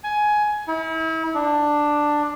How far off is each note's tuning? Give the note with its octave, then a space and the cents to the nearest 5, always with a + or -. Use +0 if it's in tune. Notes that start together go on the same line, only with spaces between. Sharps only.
G#5 +15
E4 -35
D4 +10